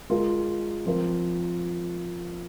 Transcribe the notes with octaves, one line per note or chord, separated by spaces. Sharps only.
G#3 F4 A#4
F3 C4 F4 A#4